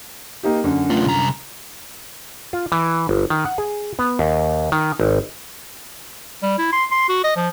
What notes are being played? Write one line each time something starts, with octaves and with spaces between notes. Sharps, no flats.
A#3 D#4 G4
F#2 D3
A3 F4
C2 A#5
F4
E3
G1
D#3
F#5
G#4
B3
D#2
D#3
G#1
G3
E4
C6
C6
F#4
D#5
F3